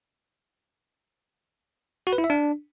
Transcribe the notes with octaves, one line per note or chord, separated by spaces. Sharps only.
F#4
B4
E4
E5
D4